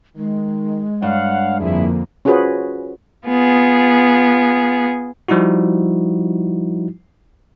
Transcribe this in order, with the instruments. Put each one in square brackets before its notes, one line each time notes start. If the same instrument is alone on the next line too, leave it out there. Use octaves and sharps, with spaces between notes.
[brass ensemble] D#3 [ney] G#3
[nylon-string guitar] G2 [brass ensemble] C#5 F5 F#5
[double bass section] F2 D3 A#3 [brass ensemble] E4 G#4
[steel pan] C#4 F4 F#4 G#4 B4 C5
[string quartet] B3 F4 G#4
[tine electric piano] F3 G3 D#4 E4 F#4